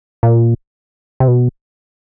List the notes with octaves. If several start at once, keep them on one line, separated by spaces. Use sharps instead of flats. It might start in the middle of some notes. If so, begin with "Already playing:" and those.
A#2
C3
B2